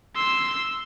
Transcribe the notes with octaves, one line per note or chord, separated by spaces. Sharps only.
C6 E6